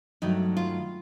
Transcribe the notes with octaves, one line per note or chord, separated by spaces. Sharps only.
G2 D#3 F#3 A3 D#4
F4